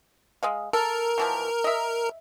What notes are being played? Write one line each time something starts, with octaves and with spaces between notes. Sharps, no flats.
G#3 D#5 F5
A4 A#4
B2 E3 F3
D#5 E5